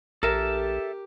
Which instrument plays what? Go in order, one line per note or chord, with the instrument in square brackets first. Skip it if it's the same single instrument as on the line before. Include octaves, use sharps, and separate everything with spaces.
[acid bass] A#1 [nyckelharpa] G4 [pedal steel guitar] A4 E5 A5 [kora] A#4